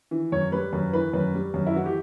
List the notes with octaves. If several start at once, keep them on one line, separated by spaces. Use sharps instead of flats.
E3
F#2 C#5
G3 B4
F#2 B4
E3 B4
F#2 B4
G3
F#2
E4
E3 F#4
G4